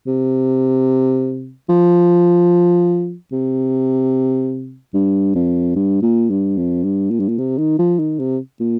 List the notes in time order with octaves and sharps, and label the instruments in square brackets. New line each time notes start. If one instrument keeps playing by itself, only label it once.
[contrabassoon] C3
F3
C3
G2
F2
G2
A#2
G2
F2
G2
A#2
G2
A#2
C3
D#3
F3
D#3
C3
A#2